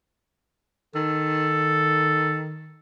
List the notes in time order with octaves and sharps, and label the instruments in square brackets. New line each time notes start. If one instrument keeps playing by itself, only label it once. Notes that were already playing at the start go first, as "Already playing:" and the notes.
[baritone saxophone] D#3 [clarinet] A4